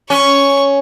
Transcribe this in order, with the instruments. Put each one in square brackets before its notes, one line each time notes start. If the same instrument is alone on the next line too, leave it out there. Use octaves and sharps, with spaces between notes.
[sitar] C#4 [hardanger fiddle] C#6